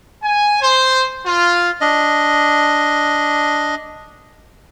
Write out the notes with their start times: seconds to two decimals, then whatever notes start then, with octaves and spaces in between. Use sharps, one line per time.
0.23 G#5
0.60 C5
1.25 F4
1.81 D4 D#5